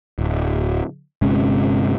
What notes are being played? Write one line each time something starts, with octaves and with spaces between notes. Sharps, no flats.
D1
G1 C3 G#3 C#4